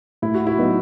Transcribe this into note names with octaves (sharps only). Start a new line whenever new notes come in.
A2 E4
F#4
E4
F#3 B3 D#4